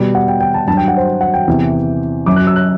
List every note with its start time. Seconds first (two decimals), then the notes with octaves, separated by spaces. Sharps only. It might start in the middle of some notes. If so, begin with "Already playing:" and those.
Already playing: B2 G3
0.15 F#5
0.28 G5
0.40 G5
0.54 A5
0.67 G2 A5
0.70 F#3
0.77 G5
0.88 F#5
0.97 C5
1.21 F#5
1.34 G5
1.47 E2 C3 E3
2.26 F#2 F#3 D6
2.36 F#6
2.47 E6
2.56 F#6